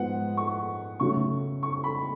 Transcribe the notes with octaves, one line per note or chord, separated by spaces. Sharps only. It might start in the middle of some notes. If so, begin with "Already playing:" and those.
Already playing: G#2 F3 G#3 B3 F#5
C#6
C#3 F#3 A3 C#6
C#6
B5